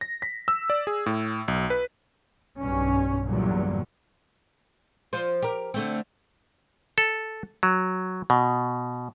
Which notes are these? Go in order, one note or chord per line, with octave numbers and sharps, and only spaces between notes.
A#6
B6
E6
D5
G#4
A2
B1
B4
B1 G2 C#4
E2 G2 A#2 D3 F#3
F3 F4 C5
G4 A#4
D3 A3 C4
A4
F#3
B2